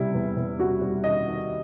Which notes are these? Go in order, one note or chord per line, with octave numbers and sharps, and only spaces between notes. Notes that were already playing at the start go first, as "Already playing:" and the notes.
Already playing: C3 G3 E4
E2
E2
G3 F#4
G3
D#3 D#5
D#3